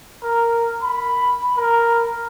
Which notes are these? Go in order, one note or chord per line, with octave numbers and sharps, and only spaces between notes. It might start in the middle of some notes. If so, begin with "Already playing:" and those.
A#4
B5
A#4